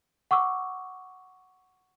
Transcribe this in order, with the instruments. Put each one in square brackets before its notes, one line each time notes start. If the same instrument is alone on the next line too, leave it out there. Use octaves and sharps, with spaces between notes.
[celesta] F#5 C#6 D6 E6